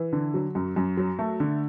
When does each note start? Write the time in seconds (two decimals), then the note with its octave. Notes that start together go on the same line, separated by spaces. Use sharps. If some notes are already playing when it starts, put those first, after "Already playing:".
Already playing: E3
0.13 D3
0.34 F#3
0.55 F#2
0.76 F#2
0.97 F#3
1.19 A3
1.40 D3